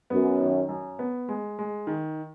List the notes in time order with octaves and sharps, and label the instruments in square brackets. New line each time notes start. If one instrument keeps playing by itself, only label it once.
[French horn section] F#2 [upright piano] B3
[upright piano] D#3
F#2
B3
G#3
G#3
D#3